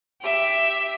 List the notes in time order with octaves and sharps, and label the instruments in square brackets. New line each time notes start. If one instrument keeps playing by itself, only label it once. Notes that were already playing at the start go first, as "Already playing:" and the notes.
[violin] G4 E5